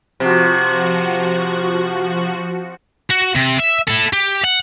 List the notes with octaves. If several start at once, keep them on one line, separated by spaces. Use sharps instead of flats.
C3 F3 F#4
F#4
C3
E5
E4 A4
G4
F#5